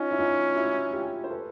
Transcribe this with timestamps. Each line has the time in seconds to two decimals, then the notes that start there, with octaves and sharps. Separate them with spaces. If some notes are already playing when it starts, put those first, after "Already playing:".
Already playing: C#4 D#4 F4
0.11 E4
0.19 D#4 F4
0.56 E4 F#4
0.93 F4 G4
1.24 C5
1.30 A4 B4